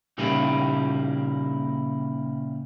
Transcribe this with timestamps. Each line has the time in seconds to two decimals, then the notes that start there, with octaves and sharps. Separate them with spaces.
0.18 A#2 C#3 G3 A#3 D#4 E4